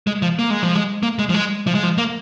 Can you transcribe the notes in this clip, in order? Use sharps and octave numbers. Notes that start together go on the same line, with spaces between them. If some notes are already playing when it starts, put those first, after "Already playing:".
G#3
F3
A#3
G#3
F3
G#3
A#3
G#3
F3
G#3
F3
G#3
F3
A#3